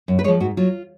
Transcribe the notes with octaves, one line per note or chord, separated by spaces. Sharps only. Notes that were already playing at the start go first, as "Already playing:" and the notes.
F#2
B4
F3 G#3 C#5
G#2 F#4
F#3 F4